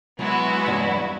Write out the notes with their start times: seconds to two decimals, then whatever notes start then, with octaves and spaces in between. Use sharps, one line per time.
0.19 F#3 G#3 B3 E4 F#4
0.66 E2 G2 F#3